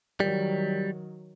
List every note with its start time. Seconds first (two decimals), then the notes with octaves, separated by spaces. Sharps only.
0.20 D#3 F#3 G3